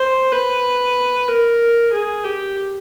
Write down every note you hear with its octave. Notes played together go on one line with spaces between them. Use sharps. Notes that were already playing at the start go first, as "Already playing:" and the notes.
Already playing: C5
B4
A#4
G#4
G4